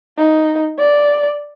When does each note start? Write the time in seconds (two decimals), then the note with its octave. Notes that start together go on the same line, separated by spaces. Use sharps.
0.18 D#4
0.79 D5